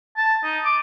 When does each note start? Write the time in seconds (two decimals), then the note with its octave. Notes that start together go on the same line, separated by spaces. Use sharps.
0.17 A5
0.44 D#4
0.65 D6